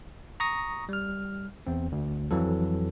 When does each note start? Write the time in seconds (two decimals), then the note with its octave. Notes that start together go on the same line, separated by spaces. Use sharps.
0.40 A#5 C#6 D#6 A#6
0.89 G3 F6
1.67 E2 C4
1.92 D2
2.31 F2 E3 F#3 A4